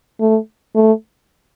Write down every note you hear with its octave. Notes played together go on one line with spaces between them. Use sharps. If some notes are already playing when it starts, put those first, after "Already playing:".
A3
A3